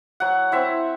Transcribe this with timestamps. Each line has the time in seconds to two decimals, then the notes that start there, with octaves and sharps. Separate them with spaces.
0.20 F#3 F#5
0.52 C4 E4 E5